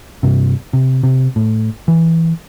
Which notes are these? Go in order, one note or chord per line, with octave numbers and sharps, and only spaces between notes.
G2 C3
C3
C3
A2
E3